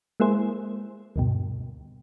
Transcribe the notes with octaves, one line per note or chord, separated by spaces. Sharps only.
G#3 A#3 E4 G#4 C5
D2 G2 B2